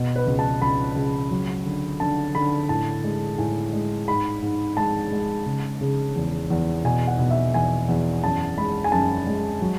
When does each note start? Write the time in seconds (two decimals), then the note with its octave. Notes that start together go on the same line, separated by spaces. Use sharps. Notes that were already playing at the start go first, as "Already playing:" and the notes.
Already playing: B2
0.16 B4
0.27 C#2
0.39 A5
0.62 C#2 B5
0.96 C#2
1.31 F#3
1.65 D3
2.00 D3 A5
2.35 D3 B5
2.69 A2 A5
3.04 G#3
3.38 A2 G#5
3.73 G#3
4.08 G#2 B5
4.42 G#2
4.77 G#3 A5
5.12 G#3
5.46 C#3
5.81 C#3
6.16 E2
6.50 E2
6.84 B2 G#5
7.07 F#5
7.19 B2
7.31 E5
7.54 E2 G#5
7.89 E2
8.23 F#2 A5
8.57 G#3 B5
8.84 G#5
8.92 F#2 A5
9.27 G#3
9.62 F#3